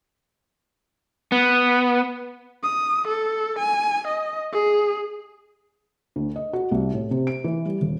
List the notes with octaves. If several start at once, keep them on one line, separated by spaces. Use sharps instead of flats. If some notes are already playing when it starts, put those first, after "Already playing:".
B3
D#6
A4
G#5
D#5
G#4
D2
D#5
F#4
C2
A2
C3
D7
E3
G3
D#1